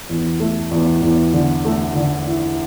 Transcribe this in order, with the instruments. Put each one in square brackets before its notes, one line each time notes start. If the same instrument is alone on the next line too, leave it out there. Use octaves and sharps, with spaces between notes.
[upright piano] E2
A3
E2
E2
D3
A3
D3
E4